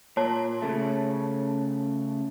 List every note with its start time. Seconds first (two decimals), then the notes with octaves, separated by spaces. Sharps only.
0.17 A#2 C#5 A5
0.62 C#3 A3